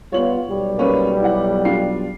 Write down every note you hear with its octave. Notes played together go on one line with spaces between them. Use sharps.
G3 B3 F4 C#5 F#7
B1 G3
A#3 C#4 B4
E4 F#5
D4 F4 C7